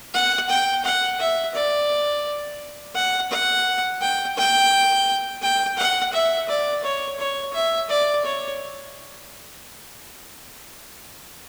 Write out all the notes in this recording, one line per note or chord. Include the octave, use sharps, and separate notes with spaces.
F#5
G5
F#5
E5
D5
F#5
F#5
G5
G5
G5
F#5
E5
D5
C#5
C#5
E5
D5
C#5